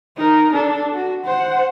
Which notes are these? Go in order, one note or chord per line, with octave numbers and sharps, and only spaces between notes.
D#4 A#4
D4 A4
F#4
C5 F#5